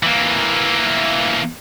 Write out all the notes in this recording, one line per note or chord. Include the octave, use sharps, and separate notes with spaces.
E3 A#3